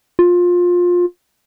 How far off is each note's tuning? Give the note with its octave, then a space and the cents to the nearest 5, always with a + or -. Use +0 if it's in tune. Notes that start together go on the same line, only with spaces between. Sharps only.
F4 +20